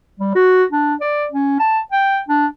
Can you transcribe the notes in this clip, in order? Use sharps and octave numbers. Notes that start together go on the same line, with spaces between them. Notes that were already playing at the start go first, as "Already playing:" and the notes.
G3
F#4
D4
D5
C#4
A5
G5
D4